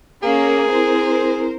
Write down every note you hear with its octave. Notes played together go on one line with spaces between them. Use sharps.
A#3 C#4 G#4
C4 E4 A#4 C5